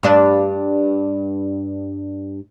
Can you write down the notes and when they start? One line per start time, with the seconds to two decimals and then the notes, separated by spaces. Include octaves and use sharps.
0.03 G2 D4